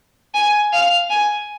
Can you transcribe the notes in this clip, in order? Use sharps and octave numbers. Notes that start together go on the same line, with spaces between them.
G#5
F5
G#5